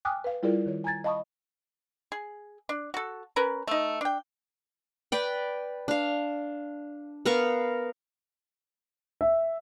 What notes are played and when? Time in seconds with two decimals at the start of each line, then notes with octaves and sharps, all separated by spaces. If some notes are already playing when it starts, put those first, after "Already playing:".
0.05 G5 G#5 D6 D#6 F6 F#6
0.24 B4 F5
0.43 G3 E4 F4 G#4 A#4 D5
0.66 D#3 C#5
0.84 G#5 A#5 G#6 A6
1.04 D#5 F5 A5 B5 C#6 D#6
2.12 G#4
2.69 D4
2.94 F#4 A4
3.36 C#4 A#4 B4
3.67 A3 D#4
4.01 D4 G5
5.12 B4 D5 G5
5.88 D4 F5
7.25 B3 A#4 F5 C#6
9.21 E5